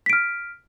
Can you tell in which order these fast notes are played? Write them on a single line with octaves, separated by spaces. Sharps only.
B6 D7 F6